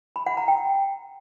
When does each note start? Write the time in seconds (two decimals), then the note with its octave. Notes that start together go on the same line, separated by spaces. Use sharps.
0.16 B5
0.26 F#5
0.37 A#5
0.48 G5